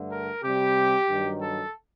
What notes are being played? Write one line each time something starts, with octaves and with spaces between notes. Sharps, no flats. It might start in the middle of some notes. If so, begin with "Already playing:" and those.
Already playing: G2 D3 A3
A#4
C3 G3 G4
G2 D#3 F#3
A4